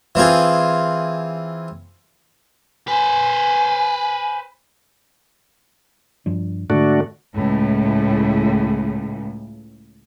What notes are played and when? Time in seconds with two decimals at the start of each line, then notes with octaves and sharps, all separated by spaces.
0.15 E3 C4 F4 G#4
2.88 B4 C5 G#5
6.26 G2 F3 D4
6.70 G#2 D3 A3 D4 F#4
7.33 C#2 A2